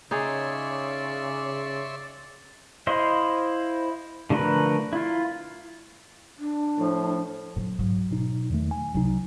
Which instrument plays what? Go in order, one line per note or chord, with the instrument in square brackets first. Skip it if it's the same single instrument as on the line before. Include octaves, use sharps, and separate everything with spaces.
[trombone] C#3 [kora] D#4 G#4 [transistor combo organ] C#5 E5 C6 [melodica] D5
[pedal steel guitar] E4 C5 D#5 F5 C6
D3 F3 A3 A#4 B4
E4 F4
[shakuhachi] D4
[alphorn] A2 [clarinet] F3
[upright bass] A#2 F#3
[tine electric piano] G#2 [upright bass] F#3
[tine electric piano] B2 D#4
E2 D#3 A3
G#5
[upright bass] C2 [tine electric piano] F#3 D#4